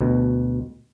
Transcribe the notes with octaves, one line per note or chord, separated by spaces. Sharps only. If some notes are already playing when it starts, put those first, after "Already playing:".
D2 B2